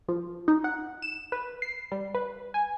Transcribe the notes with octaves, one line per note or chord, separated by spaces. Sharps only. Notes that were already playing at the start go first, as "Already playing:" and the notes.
F3
D#4
F#5
E7
B4
C7
G3
B4
G#5